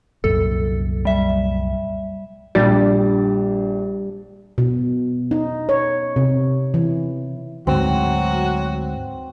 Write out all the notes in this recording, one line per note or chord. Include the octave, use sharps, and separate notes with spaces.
C2 F#2 A#2 A4
G3 E5
A#1 G3 D4 A6
B2
D#4
C#5
C3
E3
D2 G#2 F#3 C4 F#4